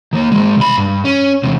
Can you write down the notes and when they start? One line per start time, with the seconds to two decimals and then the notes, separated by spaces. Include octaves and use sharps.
0.13 D#3 A#3
0.32 D#3 G#3
0.58 C2 B5
0.77 G2
1.05 C#4
1.43 E2 C3